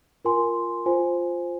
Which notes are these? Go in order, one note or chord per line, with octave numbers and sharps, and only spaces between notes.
F4 A#4 G#5 C6
F4 C5 G#5